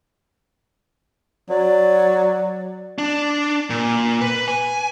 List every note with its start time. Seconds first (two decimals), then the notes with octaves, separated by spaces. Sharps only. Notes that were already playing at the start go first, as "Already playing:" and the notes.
1.50 F#3 D5
2.98 D4
3.70 A#2
4.21 B4
4.48 G#5